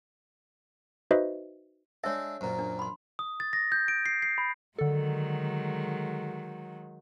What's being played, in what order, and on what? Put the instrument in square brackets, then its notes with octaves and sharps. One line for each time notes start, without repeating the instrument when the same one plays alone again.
[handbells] D#4 F#4 B4 C5 D#5 E5
[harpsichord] G#3 D4 [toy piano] C#5 E5 [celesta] E6
[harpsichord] F#2 A#2 [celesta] C5 A#5
[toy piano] D4
B5 C6
[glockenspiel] D#6
A6
A#6
G6
D7
C7
C7
B5
[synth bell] D3 A4 [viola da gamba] D#3 F#3 G#3